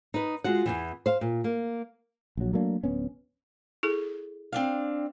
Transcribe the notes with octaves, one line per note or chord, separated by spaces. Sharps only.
D#4 B4
G#3 F4 F#4 F#5
E2 D#3 E3
C5 F5
A#2
A#3
A#1 F#3
F#3 A3 A#3 D4
D1 B3 C#4
E4 G#4 A4
C4 D4 F5